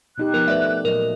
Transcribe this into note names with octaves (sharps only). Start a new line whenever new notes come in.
B2 D#4 G4 F#6
F3 B3 A#4
A3 B4 D5 E5
A#2 F#3 A#4 D#5